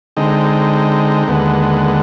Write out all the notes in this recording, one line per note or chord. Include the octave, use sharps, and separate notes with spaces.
D3 G#3 C4 D#4
D#2 D3 G#3 B3